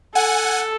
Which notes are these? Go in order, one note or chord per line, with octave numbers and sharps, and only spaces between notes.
A4 F#5 G#5